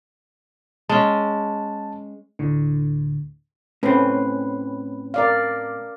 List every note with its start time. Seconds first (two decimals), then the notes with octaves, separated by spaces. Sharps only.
0.90 G#3 C#4 A5
2.39 D2 A2 D3
3.83 A2 C4 C#4 B4
5.14 A#4 D5 F5